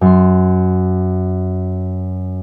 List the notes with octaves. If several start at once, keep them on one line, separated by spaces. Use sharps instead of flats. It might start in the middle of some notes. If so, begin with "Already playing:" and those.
F#2 C6